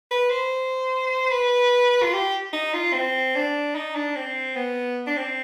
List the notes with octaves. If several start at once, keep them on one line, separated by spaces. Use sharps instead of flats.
B4
C5
B4
F4
G4
D#4
F4
C4
D4
D#4
D4
C4
B3
D4
C4